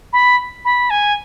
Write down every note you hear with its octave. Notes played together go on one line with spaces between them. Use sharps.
B5
B5
G#5